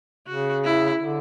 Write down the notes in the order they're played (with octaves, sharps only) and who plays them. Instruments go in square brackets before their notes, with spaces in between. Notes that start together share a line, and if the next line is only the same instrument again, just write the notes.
[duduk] C#3 [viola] F#4
[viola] E4
[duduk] D3